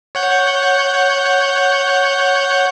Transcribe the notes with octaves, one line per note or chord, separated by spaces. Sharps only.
C#5 F#5 G6